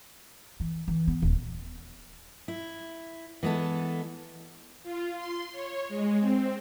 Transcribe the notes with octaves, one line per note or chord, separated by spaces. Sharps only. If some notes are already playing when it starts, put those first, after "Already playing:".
E3
E3
B3
D#1
E4
E3 G#3 B3 A4
F4
C6
C#5
G#3
C4